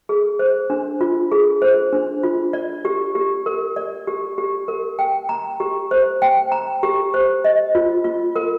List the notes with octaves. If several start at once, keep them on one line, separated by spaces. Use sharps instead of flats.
G#4
C5
D4
F4
G#4
C5
D4
F4
D5
G4
G4
A#4
D5
G4
G4
A#4
G5
A#5
G4
C5
G5
A#5
G4
C5
D#5
F4
F4
A#4